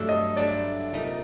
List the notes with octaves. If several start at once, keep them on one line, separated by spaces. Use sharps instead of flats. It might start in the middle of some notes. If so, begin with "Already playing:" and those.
Already playing: G2 F#3 A3 D4 A4
D#5
G2 F#3 A3 D4 A4 D5
C2 A#2 A3 D#4